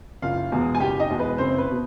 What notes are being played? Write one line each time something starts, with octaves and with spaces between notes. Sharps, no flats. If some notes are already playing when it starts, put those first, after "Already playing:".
F#1 F4 F5
E2 B2 G#3
G#5
F#1 G4 G5
D#4 D#5
E2 B2 G#3
B4
F#1 C4 C5
B4
B2